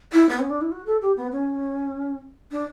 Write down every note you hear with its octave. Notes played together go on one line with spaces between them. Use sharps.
E4
B3
C#4
D4
E4
F#4
A4
G4
B3
C#4
D4